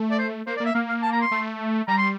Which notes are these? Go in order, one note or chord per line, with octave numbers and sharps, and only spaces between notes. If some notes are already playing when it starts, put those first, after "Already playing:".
Already playing: A3
D5
C5
A#3 C5
D5
A#3
E5
A#3 F5
F5
A5
A#5
C6
A3
G3 A#5
C6